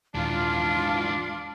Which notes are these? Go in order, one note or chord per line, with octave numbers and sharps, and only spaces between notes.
D#1 G#2 E3 D4 F4